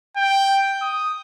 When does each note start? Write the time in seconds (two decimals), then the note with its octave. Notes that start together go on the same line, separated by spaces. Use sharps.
0.16 G5
0.82 D#6